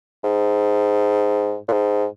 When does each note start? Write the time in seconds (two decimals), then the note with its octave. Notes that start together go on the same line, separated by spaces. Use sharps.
0.24 G#2
1.69 A#2
1.72 G#2